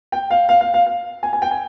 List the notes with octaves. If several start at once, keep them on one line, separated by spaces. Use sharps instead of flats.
G5
F5
F5
F5
F5
F5
G#5
G#5
G5
G#5